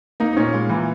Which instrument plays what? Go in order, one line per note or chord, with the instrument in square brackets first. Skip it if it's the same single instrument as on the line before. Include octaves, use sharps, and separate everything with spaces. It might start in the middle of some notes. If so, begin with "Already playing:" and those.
[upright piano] A#3 [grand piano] D#4
[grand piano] D#4
[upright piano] A#2 [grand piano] C#4
[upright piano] A#2 [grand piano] G#3
[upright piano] A#2 [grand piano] E3